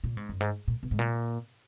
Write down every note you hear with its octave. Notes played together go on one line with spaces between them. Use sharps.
A#2
G#2
F#2
G#2
A#2
B2
G#2
A#2